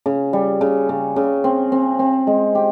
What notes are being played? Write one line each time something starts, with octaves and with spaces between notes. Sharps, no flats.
C#3
G3
C#3
C#3
C#3
C4
C4
C4
G#3
G4